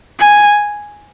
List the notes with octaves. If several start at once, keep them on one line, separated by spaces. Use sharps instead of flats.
G#5